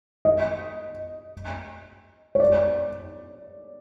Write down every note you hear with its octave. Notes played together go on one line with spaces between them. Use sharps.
D#5
C#5
D5